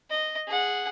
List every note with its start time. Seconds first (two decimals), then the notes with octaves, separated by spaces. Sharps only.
0.10 D#5
0.48 G#4 F#5